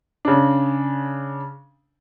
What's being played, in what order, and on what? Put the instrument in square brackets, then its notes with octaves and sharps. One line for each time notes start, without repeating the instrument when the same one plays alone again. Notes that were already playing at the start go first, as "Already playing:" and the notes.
[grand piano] C#3 D4